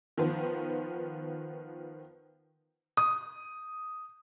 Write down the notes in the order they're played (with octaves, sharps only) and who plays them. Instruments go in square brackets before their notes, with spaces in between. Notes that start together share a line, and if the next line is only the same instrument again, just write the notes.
[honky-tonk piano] D#3 F3 B3
[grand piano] D#6